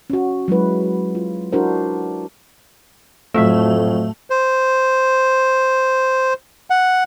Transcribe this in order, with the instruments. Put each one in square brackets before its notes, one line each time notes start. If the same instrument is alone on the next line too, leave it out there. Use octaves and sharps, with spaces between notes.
[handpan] C#4 F#4
F#3 G#3 E4 B4
F4
D4 E4 F#4 A#4 C5
[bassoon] F2 [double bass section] A2 F#3 [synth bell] A3 [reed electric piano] E5 F5 E6
[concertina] C5
F#5